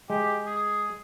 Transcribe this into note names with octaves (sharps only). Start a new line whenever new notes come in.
G#3 G4
G#4